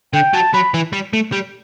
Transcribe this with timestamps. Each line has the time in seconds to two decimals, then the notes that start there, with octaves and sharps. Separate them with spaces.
0.13 D3 G5
0.34 F#3 A5
0.53 F#3 B5
0.74 E3
0.93 G3
1.13 A3
1.32 G3